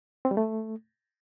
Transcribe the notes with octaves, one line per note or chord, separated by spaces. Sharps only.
C4
G3
A3